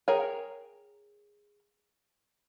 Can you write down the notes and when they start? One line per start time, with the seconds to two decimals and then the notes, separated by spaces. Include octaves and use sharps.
0.08 G#4 A#4 C#5 G5 G#5